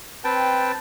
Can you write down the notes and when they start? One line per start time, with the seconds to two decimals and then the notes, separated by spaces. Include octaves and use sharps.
0.24 C4 B4 G5 A5